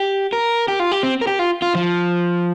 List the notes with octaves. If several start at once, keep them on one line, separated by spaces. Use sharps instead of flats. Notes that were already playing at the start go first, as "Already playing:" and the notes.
Already playing: G4
A#4
G4
F4
G4
C4
A#4
G4
F4
F4
F3